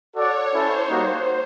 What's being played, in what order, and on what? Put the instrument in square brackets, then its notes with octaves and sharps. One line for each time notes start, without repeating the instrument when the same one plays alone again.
[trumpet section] F#4 A4 D5 F#5 [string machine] C#5
[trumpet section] C#4 E4 A4 [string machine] C5
[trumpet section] G3 A#3 D#4 F#4 [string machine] C5